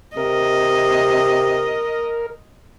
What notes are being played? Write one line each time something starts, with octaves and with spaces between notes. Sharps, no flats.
C3 A#4 D#5